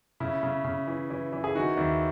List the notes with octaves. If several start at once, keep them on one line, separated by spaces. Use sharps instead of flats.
C#3 E4
C#3
C#3
E3
E3
E3
G#4
D#3 F#4
D#2 E4